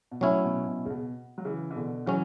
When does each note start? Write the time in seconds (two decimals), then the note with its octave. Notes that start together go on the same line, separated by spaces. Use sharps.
0.11 B2
0.21 A2 F#3 C#4 E4
0.44 B2
0.67 B2
0.85 C#3
0.90 B2
1.38 F#3
1.45 C#3 E3
1.71 E3
1.76 B2 D3
2.06 C#3 E3 F#3 C#4